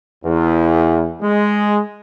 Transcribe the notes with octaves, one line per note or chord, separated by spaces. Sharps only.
E2
G#3